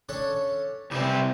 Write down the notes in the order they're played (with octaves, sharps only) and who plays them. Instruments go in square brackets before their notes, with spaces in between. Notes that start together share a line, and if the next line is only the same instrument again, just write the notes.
[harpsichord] C#4 D4 A4
[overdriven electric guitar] C2 C4 [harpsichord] E3 G3